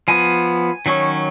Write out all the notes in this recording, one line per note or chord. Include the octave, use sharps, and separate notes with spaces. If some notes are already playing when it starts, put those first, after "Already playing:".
F3 B3 G#5
D#3 F#3 C#4